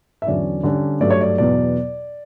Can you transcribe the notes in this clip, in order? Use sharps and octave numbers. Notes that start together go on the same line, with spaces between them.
E5
E2 D3 F#3 C#4 D5
D3 G3 C#4
G2 F#3 A3 D5
C#5
D5
E2 B2 F#3 D5